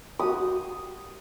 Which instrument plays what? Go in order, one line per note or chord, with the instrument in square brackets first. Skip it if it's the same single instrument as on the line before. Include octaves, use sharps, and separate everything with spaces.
[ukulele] F#4 G4 [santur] D#6